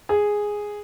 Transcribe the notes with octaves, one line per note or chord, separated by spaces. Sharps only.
G#4